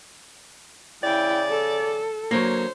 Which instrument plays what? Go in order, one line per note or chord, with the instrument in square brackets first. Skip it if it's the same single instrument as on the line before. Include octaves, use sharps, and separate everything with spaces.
[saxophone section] C#3 D5 [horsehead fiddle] E4 G5
[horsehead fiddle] A4
[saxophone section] D3 C5 C#5 [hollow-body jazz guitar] F#3 A#3